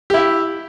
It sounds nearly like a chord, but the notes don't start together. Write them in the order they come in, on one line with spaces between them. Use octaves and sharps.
G4 E4 E5